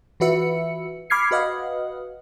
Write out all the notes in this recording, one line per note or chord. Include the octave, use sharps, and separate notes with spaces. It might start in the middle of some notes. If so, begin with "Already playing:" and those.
E3 F4 F#4 B4 E5 C#7
B5 D6 F6 G#6 C7 C#7
F#4 B4 D#5 F5 F#5